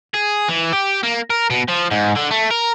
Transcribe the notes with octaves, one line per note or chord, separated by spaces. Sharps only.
G#4
E3
G4
A#3
A#4
B2
F3
G#2
D3
A3
A#4